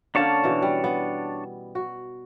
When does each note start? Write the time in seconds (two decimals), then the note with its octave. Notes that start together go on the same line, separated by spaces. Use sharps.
0.15 D3 A#3 C#4 D4 C#5 A5
0.44 B2 E3
0.62 G3
0.84 B3
1.75 F#4